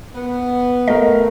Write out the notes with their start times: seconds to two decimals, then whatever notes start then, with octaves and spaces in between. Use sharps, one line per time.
0.15 B3
0.88 A3 A#4 D#5